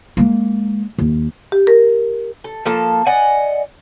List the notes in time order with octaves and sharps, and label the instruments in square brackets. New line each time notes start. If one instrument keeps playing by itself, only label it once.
[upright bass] G#3 A#3
D#2
[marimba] G4
A#4
[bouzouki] A4
F3 A#3 A4 A5
D5 D#5 F#5 G#5